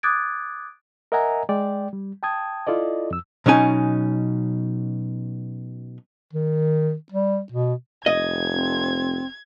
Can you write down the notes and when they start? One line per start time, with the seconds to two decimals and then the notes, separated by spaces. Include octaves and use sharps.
0.03 D6 D#6 F#6 G#6 A6 D7
1.12 A#4 D#5 E5 F#5 G#5 A#5
1.49 G#3 D5 G5
1.93 G3
2.23 G5 A5 D#6 G#6
2.67 E4 F4 A4 D5 D#5
3.11 F2 E6
3.46 B2 F#3 C#4 D#4 G#5
6.33 D#3
7.12 G3
7.52 B2
8.06 F1 D#5 G#6
8.53 C4